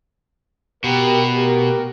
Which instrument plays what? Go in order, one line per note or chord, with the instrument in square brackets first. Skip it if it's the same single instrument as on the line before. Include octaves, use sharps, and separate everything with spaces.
[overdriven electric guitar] B2 [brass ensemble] G4 A#4
[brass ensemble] A3 G4 A#4